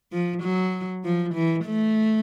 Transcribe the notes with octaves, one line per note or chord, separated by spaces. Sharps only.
F3
F#3
F3
E3
A3